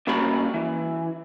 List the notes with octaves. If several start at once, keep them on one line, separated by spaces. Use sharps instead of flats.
G2 C#3 A#3 F#4 A#5 B5
E3